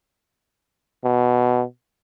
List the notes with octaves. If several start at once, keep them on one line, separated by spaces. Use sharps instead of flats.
B2